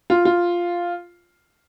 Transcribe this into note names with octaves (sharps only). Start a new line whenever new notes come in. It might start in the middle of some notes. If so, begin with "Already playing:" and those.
F4
F4